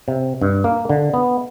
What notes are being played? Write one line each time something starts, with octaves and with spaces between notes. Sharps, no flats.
C3
G2
A#3
D3
B3